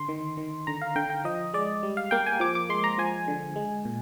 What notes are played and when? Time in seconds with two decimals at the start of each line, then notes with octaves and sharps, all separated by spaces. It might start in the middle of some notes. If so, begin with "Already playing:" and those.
Already playing: D3 C6
0.08 D#3
0.37 D#3
0.67 D3 A#5
0.82 F5
0.95 D3 G5
1.10 G5
1.24 F3 D#5
1.54 G#3 D5
1.83 G3
1.97 F5
2.11 A#3 G5
2.26 G#5
2.40 F3 D6
2.55 D6
2.69 G#3 C6
2.84 A#5
2.98 F3 G#5
3.28 D3
3.56 G#3
3.85 A#2